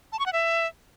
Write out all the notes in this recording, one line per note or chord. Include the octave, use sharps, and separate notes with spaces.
A5
C#6
F#5
E5